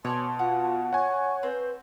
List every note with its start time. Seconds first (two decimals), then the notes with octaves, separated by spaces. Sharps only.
0.05 B2 C#5 D5 G#5 A5 C6
0.39 F4 F#4
0.93 C#5 F#5 G#5 C#6
1.43 C4 B4 C5